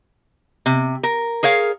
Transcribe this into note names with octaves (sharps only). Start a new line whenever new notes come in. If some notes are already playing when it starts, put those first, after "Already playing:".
C3
A#4
G#4 A#4 C#5 F5